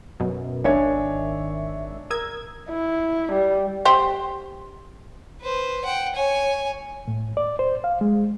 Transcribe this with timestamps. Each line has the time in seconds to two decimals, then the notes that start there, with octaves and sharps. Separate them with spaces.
0.20 F#2 B2
0.64 G#1 D#3 D4 C#5 E5 G#5
2.10 A#4 D#6 E6 G#6
2.70 E4
3.33 G3
3.85 G4 C5
5.41 B4 C5
5.85 F#5 G5
6.15 C#5 G#5
7.08 A2
7.37 D5
7.59 C5
7.84 F5
8.01 G#3